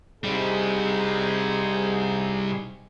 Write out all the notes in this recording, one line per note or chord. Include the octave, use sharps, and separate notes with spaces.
C3 G3 C4 D#4 G#4